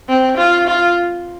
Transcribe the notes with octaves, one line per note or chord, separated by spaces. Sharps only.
C4
F4
F4